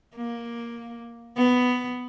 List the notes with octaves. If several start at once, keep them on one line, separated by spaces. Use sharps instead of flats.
A#3
B3